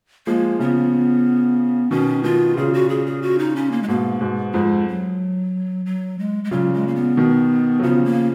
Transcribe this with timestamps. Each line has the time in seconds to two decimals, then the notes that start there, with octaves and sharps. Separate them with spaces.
0.27 F3 G#3 A#3
0.59 C#3 F3 B3
1.91 B2 D#3 C#4
2.23 B2 D#3 F4
2.57 A#2 C#3 G#4
2.73 F#4
2.89 G#4
3.06 G#4
3.22 F#4
3.39 D#4
3.56 C#4
3.72 A#3
3.83 G#3
3.88 G#2 B2 A#3
4.21 G#2 B2
4.54 F2 G#2 G#3
4.88 F#3
5.86 F#3
6.19 G#3
6.44 G#3
6.51 A#2 C#3 F#3
6.74 G#3
6.87 A#3
6.95 B3
7.17 B2 D#3
7.80 F#3
7.83 C#3 F3 B3
8.05 A#3